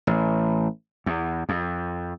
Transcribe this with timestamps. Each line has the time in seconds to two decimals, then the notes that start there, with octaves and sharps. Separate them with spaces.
0.07 A1
1.06 E2
1.49 F2